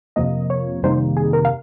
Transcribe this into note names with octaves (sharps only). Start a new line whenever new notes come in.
F2 C3 F3 A#3 D#5
C#5
F2 C3 D#3 G3 A#3 C5
G#4
A#4
F5